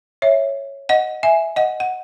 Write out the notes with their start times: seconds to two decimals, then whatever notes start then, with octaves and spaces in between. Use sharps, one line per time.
0.22 C#5 E5
0.89 D#5 F#5
1.23 E5 G#5
1.56 D#5 F#5
1.80 F#5